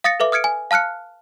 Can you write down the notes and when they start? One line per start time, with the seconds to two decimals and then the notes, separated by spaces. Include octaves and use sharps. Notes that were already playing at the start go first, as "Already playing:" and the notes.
0.04 F5 D#6 A6 A#6 C#7
0.20 A4 B4 E5 D6
0.32 D#6 F6 G#6 C#7 D7
0.44 G#5
0.71 F5 A5 F6 F#6 C#7